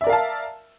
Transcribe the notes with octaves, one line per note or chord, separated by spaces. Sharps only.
A#4 D5 E5 F5 A5